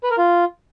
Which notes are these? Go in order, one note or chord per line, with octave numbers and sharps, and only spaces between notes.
B4
A#4
F4